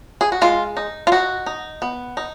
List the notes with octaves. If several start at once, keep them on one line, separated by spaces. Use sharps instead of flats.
G#4
F#4
G#3 F4
D#4
F4
D#4 F#4
D#4
B3
D#4